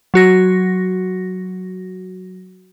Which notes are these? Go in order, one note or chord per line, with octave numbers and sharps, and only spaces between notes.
F#3 F#4 A#6